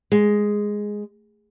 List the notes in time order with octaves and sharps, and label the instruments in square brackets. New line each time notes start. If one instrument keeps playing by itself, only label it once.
[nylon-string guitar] G#3